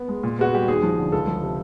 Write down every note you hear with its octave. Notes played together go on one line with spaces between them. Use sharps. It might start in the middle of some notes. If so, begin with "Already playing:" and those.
Already playing: B3
G#3
A#2
B3 F#4
G3 G4
D#2 G#4
F3
D3
C#2 A4
F3
C3